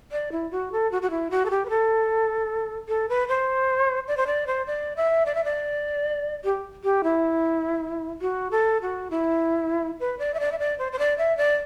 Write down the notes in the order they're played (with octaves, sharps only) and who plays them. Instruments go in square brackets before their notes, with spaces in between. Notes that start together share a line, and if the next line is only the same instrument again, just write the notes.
[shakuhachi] D5
E4
F#4
A4
F#4
F#4
E4
F#4
A4
G4
B4
A4
A4
B4
C5
D5
C5
D5
C5
D5
E5
D5
E5
D5
G4
G4
E4
F#4
A4
F#4
E4
B4
D5
E5
D5
E5
D5
C5
C5
D5
E5
D5